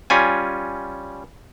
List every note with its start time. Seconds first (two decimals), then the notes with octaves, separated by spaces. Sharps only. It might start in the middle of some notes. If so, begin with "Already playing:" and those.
0.10 G3 C#4 F4 G#5